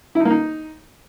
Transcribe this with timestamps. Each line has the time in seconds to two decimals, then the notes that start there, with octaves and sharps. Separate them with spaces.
0.15 E4
0.20 D#4
0.25 A#3
0.30 D#4